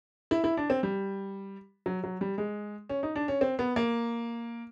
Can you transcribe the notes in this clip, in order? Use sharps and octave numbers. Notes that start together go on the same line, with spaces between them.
E4
E4
D4
C4
G3
F#3
F#3
G3
G#3
C#4
D#4
D4
C#4
C4
B3
A#3